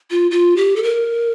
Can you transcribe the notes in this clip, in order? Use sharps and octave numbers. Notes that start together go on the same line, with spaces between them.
F4
F4
G4
A4
A#4